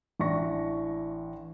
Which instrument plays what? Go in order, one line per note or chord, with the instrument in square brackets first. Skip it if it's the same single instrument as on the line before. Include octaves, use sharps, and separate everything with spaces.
[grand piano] A1 D4 E4 C#6 A#6